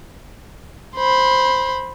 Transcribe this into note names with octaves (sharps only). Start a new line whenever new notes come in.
C5 B5